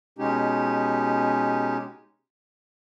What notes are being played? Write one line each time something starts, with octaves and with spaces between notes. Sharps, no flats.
B2 G#3 C#4 D#4 G4